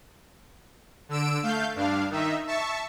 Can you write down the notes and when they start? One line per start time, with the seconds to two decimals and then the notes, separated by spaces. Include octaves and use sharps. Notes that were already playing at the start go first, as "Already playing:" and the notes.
1.09 D3 E6 D7
1.43 A3 F5 G6
1.74 G2 D4 F5
2.10 D#3 D#4 E5
2.46 E5 A5 C#6